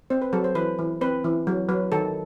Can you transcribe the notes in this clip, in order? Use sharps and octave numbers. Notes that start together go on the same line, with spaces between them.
C4 C5
B4
F#3 A4
C5
E3 B4
E3
C4 B4
E3
F#3
F#3 B4
D#3 A4